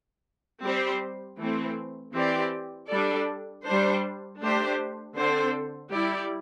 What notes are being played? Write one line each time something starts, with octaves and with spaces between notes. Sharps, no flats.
G3 C4 G4 C5
E3 A3 C4
E3 C4 G4 D5
G3 D4 A4 D5
G3 D4 C5
A3 D4 G4 C5
D3 C4 A4 C5
G3 E4 G4 D5